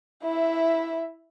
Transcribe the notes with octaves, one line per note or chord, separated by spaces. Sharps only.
E4 E5